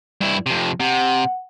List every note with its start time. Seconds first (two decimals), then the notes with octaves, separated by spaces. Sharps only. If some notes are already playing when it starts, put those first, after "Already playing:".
0.21 G2 E4
0.46 F2 C3
0.80 C3 F#5